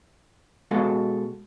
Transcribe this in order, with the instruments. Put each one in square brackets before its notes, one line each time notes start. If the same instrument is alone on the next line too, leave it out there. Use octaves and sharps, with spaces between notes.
[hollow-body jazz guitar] B2 G#3 F#4 A4 F5